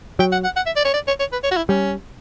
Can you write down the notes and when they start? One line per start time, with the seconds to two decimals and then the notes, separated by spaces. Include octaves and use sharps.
0.19 F#3 G5
0.32 F#5
0.44 F#5
0.56 F#5
0.66 E5
0.76 D5
0.85 C#5
0.94 D5
1.07 C#5
1.20 C#5
1.32 B4
1.44 C#5
1.51 F#4
1.57 E4
1.69 G3 C#4